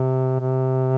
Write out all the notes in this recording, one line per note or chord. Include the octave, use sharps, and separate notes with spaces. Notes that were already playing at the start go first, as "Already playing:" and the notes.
Already playing: C3
C3